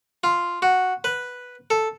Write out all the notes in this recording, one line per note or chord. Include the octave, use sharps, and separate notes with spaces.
F4
F#4
B4
A4